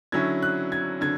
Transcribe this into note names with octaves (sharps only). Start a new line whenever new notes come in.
D3 F#3 C#4 E4 G#6
F#6
G#6
D3 G#6